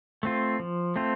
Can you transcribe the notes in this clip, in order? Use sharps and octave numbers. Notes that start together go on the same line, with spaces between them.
A3 C4 F4
F3
A3 C4 F4